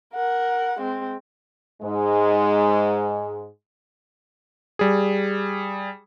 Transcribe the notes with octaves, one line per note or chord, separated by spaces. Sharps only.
A#4 F#5
G#3 C4
G#2 G#3
G3 G#4